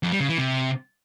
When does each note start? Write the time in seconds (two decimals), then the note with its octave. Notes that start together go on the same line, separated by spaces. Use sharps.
0.03 F2
0.12 G3
0.20 C#3
0.29 E3
0.38 C3